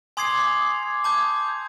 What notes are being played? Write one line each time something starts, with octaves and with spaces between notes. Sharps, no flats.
G#5 C6 D6 D#6 G#6 C7
D6
D#6
G#6
A5 D6 G6
G6